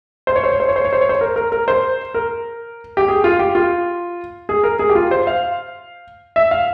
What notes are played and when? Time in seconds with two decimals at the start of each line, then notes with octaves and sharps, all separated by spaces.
0.27 C5
0.36 C#5
0.44 C5
0.52 C#5
0.60 C5
0.68 C#5
0.76 C5
0.85 C#5
0.93 C5
1.01 C#5
1.09 C5
1.21 A#4
1.36 A#4
1.52 A#4
1.68 C5
2.14 A#4
2.97 G4
3.08 G#4
3.24 F4
3.39 G4
3.55 F4
4.49 G#4
4.63 A#4
4.79 G#4
4.89 G4
4.95 F4
5.11 C5
5.27 F5
6.36 E5
6.51 F5